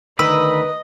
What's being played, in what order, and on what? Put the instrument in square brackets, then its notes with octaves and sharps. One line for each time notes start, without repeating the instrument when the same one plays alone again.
[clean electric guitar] D2 D#3 A#4 [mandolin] B4 [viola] D#5 [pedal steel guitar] B5 E6